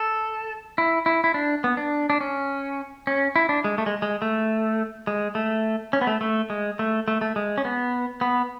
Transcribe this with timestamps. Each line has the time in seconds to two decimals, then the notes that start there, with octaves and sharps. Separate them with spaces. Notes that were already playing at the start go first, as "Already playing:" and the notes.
Already playing: A4
0.78 E4
1.06 E4
1.24 E4
1.34 D4
1.64 B3
1.77 D4
2.10 D4
2.21 C#4
3.07 C#4
3.36 E4
3.49 D4
3.64 G#3
3.78 A3
3.86 G#3
4.02 G#3
4.22 A3
5.07 G#3
5.35 A3
5.93 C#4
6.01 B3
6.07 A3
6.21 A3
6.50 G#3
6.79 A3
7.08 A3
7.21 A3
7.36 G#3
7.58 C#4
7.65 B3
8.21 B3